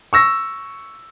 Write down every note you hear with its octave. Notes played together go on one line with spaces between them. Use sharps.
C#6 E6 A#6